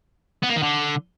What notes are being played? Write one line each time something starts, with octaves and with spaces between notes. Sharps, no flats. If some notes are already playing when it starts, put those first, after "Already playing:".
B3
A#3
D#3
D3